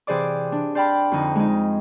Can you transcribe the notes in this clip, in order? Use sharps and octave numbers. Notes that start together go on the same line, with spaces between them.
C3 E3 G#4 C5 D5 D6
D4
C5 D5 F5 G5 A5 B5
F2 D3 D#4
G#3 D#4